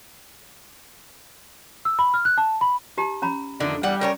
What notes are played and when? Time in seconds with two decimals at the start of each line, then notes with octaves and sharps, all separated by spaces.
1.85 E6
1.99 B5
2.14 F6
2.25 F#6
2.38 A5
2.61 B5
2.98 D#4 G4 A#5
3.22 C#4 A#5 B5
3.60 F2 D3 D#3 A3 D4
3.83 E2 G3 F#5
4.01 C#4 A#4 C#5 G#5